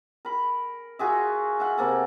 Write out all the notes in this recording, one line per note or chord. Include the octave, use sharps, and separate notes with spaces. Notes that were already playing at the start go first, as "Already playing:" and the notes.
A#4 B5
F4 F#4 G#4 E5
E5 F#5
C3 A#3 A4